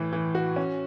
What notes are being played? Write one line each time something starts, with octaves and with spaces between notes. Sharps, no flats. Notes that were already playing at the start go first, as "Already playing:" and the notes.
Already playing: A2 E3
E3
F#4
C#4